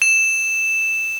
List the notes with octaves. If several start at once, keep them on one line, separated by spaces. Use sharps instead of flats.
E7